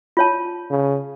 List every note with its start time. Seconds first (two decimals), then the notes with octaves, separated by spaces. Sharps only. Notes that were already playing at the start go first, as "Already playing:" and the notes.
0.17 F4 C#5 A5
0.71 C#3